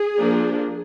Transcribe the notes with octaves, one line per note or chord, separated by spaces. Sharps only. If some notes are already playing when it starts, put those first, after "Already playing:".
Already playing: G#4
F3 A#3 D4